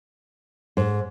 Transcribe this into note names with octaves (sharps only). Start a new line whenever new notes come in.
G#2